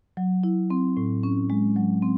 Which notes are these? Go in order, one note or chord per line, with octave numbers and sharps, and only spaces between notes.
F#3
E4
C4
A2
C#4
G#3
F#3
C4